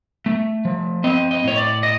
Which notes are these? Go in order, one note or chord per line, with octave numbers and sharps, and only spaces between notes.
A3
F3
C4 D#5
D#5
A2 C#5
D5
D#5